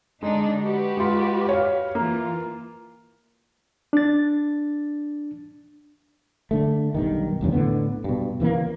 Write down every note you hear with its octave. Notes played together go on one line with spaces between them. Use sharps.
D3 G#3 D4 D#4
F#4 G4 B4
G#3 F4
C#5 F5
E3 A#3 F4
D4 A6
D3 A3
B1 G2 D#3
G#1 E2 G2 C#3
A2 D3 B3
G2 B2
C#3 E3 G#3 A#3